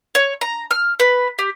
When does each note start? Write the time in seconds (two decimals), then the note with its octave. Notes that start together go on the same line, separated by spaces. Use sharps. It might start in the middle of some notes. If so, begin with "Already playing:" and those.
0.15 C#5
0.41 A#5
0.71 F6
1.00 B4
1.39 G4